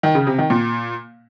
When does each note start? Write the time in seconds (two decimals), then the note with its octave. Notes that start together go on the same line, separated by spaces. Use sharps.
0.03 D#3
0.15 C#3
0.27 C3
0.38 D#3
0.50 A#2